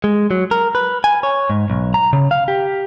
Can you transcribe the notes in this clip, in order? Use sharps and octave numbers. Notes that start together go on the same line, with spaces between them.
G#3
F#3
A#4
B4
G#5
C#5
G#2
B1
A#5
C#3
F5
G4